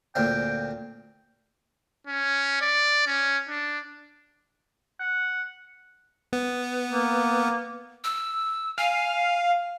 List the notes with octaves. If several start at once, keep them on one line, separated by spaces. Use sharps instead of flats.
D2 A#2 C4 G5
C#4
D5
C#4
D4
F#5
B3
A#3
E6
F5 G#5